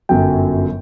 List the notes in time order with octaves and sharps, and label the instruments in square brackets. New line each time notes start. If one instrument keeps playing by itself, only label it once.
[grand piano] G1 F#2 F#3 G5